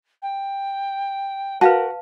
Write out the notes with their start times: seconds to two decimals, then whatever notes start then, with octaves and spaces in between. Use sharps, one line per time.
0.22 G5
1.61 F#4 A#4 B4 F5 A5